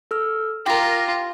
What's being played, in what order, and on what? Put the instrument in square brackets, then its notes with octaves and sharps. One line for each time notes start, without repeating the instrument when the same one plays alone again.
[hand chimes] A4 E6 F6
[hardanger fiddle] F4 [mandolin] G4 A#4 [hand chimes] G5 A#6